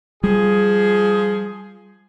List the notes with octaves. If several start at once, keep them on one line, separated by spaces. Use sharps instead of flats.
F3 G3 F4 G#4